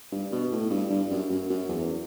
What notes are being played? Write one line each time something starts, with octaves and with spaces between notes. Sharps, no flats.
G2
B2
A2
G2
G2
F#2
F#2
F#2
E2